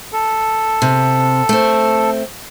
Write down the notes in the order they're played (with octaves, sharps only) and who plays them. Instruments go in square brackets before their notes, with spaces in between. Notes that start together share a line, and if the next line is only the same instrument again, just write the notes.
[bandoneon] A4
[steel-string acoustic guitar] C3
A3 C4